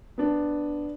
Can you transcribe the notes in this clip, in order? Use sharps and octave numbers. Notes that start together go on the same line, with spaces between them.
B3 D4